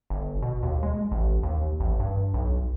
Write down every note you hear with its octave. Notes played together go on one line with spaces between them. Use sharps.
G1
B2
D#2
G#3
A1
D#2
A1
G2
B1